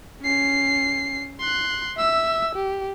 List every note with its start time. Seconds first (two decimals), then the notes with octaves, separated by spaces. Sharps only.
0.22 C#4 C7
1.40 C6 F#6
1.97 E5 E6
2.55 G4